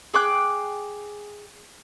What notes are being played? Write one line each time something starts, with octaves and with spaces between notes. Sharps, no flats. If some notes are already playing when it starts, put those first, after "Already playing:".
G#4 G5 D6 F#6